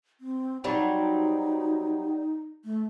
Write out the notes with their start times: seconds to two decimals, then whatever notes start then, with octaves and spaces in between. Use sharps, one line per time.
0.20 C4
0.64 F#3 G3 C4 D#4
2.64 A3